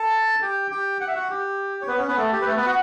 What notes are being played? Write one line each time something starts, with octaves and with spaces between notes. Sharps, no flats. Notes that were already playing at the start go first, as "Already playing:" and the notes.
Already playing: A4 A5
G4 G5
G4 G5
F#5
E5
F#4 F#5
G4
C#5
B3 B4
C#4 C#5
B3 B4
A3 A4
G4
B4
A3 A4
B3 B4
F#4 F#5